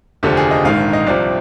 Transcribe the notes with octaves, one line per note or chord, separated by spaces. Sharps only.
F1 D#2 D3 F3 G4
G#4
D#5
A#1 G#2 D#3 F5
D#5
C2 C3 F3 D5